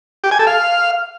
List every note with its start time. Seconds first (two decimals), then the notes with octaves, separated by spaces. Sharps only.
0.24 G4
0.31 G#5
0.39 A4
0.47 F5